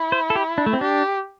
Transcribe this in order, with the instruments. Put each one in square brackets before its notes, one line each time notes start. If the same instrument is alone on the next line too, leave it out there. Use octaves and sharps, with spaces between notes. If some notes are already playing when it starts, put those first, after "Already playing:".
Already playing: [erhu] E4
[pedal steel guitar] C5
A4
G4
D4
A3
C4
[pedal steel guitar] D4 [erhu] G4